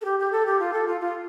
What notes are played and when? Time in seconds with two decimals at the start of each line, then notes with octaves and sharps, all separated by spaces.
0.01 A4
0.04 G4
0.19 G4
0.32 A4
0.46 G4
0.59 F4
0.73 A4
0.87 F4
1.00 F4